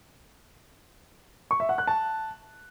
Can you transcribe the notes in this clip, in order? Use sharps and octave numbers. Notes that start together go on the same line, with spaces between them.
C#6
E5
F#5
F#6
A5